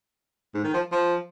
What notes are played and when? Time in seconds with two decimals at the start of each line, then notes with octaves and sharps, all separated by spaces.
0.54 G#2
0.64 D#3
0.74 F3
0.92 F3